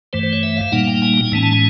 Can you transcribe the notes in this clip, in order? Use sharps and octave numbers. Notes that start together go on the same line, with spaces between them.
G2 E3 A3 C5
C5
C#5
E5
F5
A#2 G3 A#3 D#4 F#5
G5
G#5
G#5
A2 E3 G#3 C#4 A5
A5